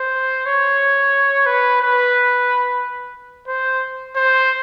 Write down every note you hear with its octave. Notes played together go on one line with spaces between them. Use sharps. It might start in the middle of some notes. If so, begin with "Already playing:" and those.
Already playing: C5
C#5
B4
B4
C5
C5